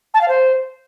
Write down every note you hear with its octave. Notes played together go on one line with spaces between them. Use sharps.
A5
F5
C5